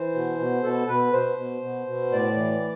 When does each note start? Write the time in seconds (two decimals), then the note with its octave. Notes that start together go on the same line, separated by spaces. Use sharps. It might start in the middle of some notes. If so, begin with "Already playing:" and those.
Already playing: E3 C5
0.14 B2
0.39 B2
0.63 B2 A4
0.88 B2 B4
1.13 B2 C5
1.38 B2
1.62 B2
1.87 B2
2.11 A2 D5
2.37 E3